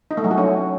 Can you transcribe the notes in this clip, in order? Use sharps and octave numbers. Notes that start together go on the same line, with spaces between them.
D#4
A3
F#3
F#4
C#4